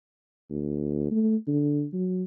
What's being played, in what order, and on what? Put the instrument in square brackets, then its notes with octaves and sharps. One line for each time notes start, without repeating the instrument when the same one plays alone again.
[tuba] D2
A3
D3
F#3